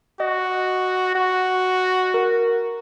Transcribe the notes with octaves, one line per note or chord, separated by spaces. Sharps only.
F#4 D#5
F#4
A#4